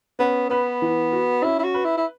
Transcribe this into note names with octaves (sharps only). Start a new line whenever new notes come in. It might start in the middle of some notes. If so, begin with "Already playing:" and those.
B3 C#4
B3 B4
E3
F#4
C#4 E4
E4
F#4
B4
E4
E4